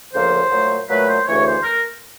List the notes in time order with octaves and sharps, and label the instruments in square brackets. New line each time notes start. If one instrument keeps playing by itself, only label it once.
[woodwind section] D2 C#3 F3 A#3 C5
A#2 F#3 A3
A#2 F#3 A3 B4
C5
D2 C#3 E3 A3 C#5
C5
A#4